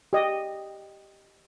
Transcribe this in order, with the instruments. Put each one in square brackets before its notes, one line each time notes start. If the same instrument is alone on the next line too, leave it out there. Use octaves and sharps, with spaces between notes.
[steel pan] G4 D#5